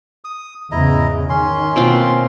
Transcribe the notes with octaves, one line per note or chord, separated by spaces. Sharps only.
D#6
E2 G#2 C#3 E4 D#5 A#5
D#3 C#4 C6
B2 A#3 C4 F4